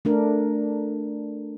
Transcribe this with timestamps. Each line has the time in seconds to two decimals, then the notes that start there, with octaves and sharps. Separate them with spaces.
0.05 A3 D4 A#4